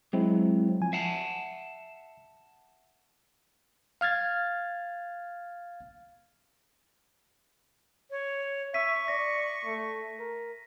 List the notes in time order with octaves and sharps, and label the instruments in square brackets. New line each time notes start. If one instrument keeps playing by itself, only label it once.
[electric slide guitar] F#3 [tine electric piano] G#3 C4 E4
[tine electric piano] F3 G#5
[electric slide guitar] E5 F#5 A5 [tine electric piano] C7
[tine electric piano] F5 F6 G#6 A6
[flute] C#5
[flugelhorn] E5 [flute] C#6 [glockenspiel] B6 D#7
[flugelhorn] D5 [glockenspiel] A#6 B6
[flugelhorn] A3
A#4